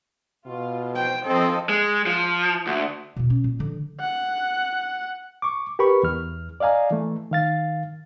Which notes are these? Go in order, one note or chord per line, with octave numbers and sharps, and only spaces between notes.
B2 F4
C5 G5
F3 C4 A4 C5 D#5
G#3
F3
D2
E2 B2
C#4
A#2
D3 F3
F#5
C#6 D6
G4 A#4 B4 B5 C#6
E2 F6
D5 D#5 F5 G#5 A#5
E3 A3
D#3 F5 A6